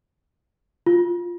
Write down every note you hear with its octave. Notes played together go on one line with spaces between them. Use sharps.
F4